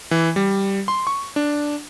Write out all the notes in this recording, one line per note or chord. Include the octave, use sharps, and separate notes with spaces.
E3
G3
C6
C#6
D4